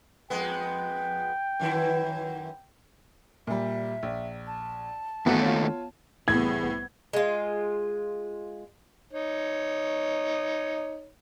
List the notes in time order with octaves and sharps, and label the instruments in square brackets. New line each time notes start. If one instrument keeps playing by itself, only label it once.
[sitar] F2 G#3 B3 [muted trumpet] G5
[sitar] F#2 D#3 E4
[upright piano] A#2 G3 [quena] E5
[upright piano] A#1
[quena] A5
[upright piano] G#1 E3 F#4 [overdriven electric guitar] D#2 A3 [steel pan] B3
[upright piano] F4 C#5
[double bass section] C2 B3 [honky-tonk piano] A2 [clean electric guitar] E3 G#4 [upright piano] G#6
[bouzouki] G#3 F4
[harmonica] D#4 C#5